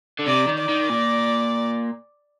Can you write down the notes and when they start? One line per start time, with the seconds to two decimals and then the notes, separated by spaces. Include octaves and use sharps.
0.20 D3
0.27 C3 D5
0.48 D#3
0.58 D5
0.69 D#3
0.90 A#2